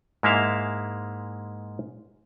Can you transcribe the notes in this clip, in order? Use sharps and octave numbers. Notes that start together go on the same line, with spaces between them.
G#2 G#3 A#3 E4 E5 F5